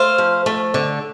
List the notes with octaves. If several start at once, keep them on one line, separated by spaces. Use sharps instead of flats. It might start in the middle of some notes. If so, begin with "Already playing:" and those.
Already playing: A3 C5 F5
F3
A3
D3